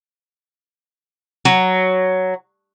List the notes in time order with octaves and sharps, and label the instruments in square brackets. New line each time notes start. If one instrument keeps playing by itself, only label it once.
[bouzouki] F#3